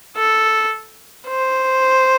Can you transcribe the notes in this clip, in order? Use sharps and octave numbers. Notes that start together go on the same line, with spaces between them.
A4
C5